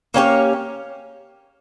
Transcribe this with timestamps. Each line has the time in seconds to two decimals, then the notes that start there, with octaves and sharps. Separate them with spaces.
0.14 A#3 C#4 G4 C#5